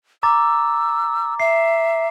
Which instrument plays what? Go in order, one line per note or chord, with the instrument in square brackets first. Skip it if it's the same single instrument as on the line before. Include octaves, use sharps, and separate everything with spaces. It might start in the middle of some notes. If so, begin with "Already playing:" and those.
[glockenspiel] A#5 D6 A6 [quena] E6
[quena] E5 [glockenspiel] C7